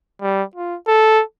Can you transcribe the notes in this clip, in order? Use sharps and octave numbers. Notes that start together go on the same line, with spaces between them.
G3
F4
A4